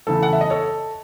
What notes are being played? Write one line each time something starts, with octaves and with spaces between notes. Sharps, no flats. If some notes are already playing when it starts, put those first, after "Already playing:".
E2 C#3 E3 A3 A4
F#5
E5
D#5
A4 C#5